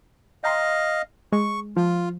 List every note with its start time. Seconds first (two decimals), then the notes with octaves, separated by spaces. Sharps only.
0.44 D#5 F5 G5 A#5 C6
1.32 G#3 C#6
1.76 F3 F4